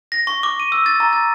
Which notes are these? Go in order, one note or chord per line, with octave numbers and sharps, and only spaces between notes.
A#6
C#6
D6
D#7
E6
A6
A#5
A6